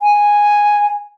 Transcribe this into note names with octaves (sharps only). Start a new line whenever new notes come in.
G#5